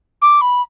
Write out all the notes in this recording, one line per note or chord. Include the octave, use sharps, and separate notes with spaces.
D6
B5